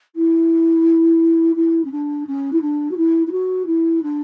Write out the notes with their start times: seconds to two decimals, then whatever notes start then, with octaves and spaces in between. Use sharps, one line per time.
0.15 E4
1.55 E4
1.84 C#4
1.91 D4
2.26 C#4
2.52 E4
2.61 D4
2.91 F#4
2.97 E4
3.27 E4
3.31 F#4
3.66 E4
4.02 D4